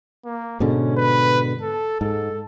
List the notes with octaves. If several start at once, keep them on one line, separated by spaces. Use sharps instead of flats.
A#3
G#2 B2 D3 C#4
B4
A4
G#2 A4